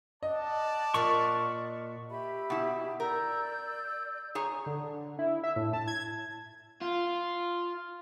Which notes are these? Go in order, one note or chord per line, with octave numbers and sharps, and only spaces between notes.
D5 D#5 F#5 A5
A#2 A#3 C#6
G4 E5 B5
B2 E4
A#4 D5 E6 G6
G#4 C#5 A#5
D3
E4
E5
A2
A5
G#6
F4